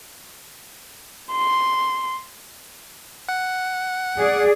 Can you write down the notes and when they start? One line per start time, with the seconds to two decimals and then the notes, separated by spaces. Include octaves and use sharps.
1.32 C6
3.29 F#5
4.18 G#4 D5